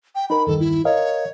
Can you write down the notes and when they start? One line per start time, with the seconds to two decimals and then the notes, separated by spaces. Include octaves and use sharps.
0.15 G5
0.30 D#4 A#4 B5
0.47 E2 G2 D#3 A4
0.60 E4
0.85 A#4 C#5 D#5 F5